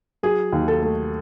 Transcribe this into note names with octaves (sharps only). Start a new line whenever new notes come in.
F#3 G#4
D#2
A4
A3